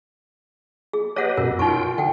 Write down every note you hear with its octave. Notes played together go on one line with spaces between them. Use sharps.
G#4
G4 B4 C#5 D#5 F#5
F#2 B2 A#4
D#4 F4 G5 C#6
D3 F#5 G5